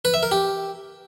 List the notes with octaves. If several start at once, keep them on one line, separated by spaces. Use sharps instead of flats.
B4
E5
A#4
G4